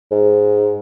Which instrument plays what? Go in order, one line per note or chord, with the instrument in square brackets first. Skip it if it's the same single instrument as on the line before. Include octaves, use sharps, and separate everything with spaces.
[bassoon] G#2